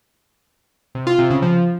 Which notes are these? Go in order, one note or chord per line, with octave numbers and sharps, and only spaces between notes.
C3
F4
C3
C#3
F3